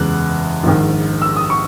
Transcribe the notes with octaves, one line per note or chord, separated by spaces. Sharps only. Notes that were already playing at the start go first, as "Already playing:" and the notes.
Already playing: F#1 E2 C#3 G#3 F#6
A#1 G#2 D#3
E6
D#6
C#6